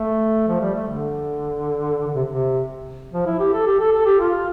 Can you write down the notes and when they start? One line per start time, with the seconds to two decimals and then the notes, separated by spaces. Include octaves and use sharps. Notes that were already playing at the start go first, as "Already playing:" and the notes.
Already playing: A3
0.47 F3
0.61 G3
0.74 A3
0.87 D3
2.07 D3
2.14 C3
2.29 C3
3.13 F3
3.26 E4
3.39 G4
3.53 A4
3.67 G4
3.80 A4
3.92 A4
4.05 G4
4.19 F4